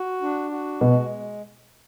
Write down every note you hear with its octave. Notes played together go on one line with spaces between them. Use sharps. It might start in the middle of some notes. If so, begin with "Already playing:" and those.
Already playing: F#4
D4
F#4
B2 G#3